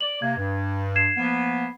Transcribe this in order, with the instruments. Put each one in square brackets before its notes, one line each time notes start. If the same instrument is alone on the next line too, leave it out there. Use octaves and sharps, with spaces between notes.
[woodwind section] D5 [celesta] F#7
[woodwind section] C3 A#3 [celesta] G#6
[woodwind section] G2
[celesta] G#6 C7 E7
[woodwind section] F3 A#3 B3